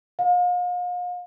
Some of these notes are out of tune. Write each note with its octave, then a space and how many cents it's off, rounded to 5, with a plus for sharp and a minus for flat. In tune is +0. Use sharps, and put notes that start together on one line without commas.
F5 +40